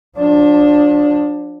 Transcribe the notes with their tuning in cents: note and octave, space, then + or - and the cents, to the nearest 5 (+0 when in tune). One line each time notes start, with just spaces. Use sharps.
F3 +40 D4 +5